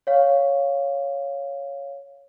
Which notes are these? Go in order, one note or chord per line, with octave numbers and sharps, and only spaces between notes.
C#5 F5